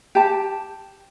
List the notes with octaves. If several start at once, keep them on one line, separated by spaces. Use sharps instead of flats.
G4 A5